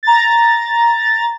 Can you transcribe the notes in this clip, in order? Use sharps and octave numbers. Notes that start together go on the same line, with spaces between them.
A#5 A6